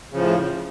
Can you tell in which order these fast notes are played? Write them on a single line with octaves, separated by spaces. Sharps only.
C#3 F3 A2